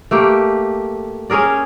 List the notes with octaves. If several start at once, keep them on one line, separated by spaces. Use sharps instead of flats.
A3 A#3 G4
C#4 G#4 A#4 D5